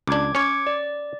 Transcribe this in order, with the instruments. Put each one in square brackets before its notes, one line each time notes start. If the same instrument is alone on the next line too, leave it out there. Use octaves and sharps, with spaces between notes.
[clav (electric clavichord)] C#2 D4 [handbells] D6 G#6
[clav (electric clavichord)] C#4 C#5 [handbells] D6 G#6 C#7
[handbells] D5